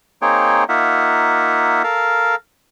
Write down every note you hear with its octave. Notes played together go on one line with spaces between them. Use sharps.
A#3 C4 D#4 G#4 C#5 G5
A#3 D#4 F4 E5 F#5
A4 A#4 F5